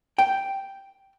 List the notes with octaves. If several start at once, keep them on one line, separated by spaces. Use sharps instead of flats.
G5